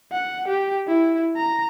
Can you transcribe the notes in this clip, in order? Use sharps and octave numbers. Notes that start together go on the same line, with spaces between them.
F#5
G4
E4
A#5